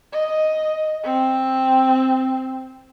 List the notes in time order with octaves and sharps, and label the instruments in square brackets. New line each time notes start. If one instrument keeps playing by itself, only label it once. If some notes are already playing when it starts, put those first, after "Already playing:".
[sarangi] D#5
C4